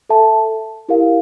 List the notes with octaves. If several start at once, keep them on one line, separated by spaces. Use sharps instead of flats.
A4 E5 A5
E4 G4 A#4 F5